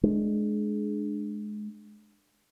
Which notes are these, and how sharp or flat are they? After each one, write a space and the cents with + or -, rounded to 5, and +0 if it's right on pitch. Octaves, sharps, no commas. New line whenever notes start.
G#3 +25 D4 +20